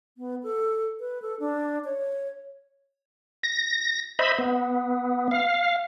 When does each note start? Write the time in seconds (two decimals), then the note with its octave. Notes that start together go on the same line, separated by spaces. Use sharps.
0.18 B3
0.43 A4
1.00 B4
1.22 A4
1.40 D4
1.85 C#5
3.43 A#6
4.19 C5 D#5 E5 B5
4.38 B3
5.31 F5